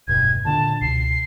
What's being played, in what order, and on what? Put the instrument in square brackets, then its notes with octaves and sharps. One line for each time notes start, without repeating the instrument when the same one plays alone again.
[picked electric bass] E1 G2 B2 [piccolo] G#6
[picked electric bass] A#2 D3 D4 [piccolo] A5
[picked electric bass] C#2 B2 [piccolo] C7